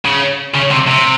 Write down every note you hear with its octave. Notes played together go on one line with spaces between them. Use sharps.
C#3
C#3
C3
C3